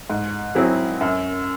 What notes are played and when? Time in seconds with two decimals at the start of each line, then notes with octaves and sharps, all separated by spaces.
0.10 G#2
0.55 F#3 C4 E4 G#4
1.01 F#2